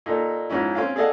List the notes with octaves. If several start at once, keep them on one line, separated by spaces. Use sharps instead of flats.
A#2 D#4 A4
G#2 F3 C#4 E4
C4 C#4 F5
G#4 A4 D5 D#5 F5 F#5